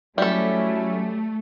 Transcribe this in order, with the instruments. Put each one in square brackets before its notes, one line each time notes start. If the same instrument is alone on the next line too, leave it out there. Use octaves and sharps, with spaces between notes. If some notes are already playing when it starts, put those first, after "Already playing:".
[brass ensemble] F#3 C#4 [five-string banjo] G3 A4 [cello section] A3 [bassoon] E4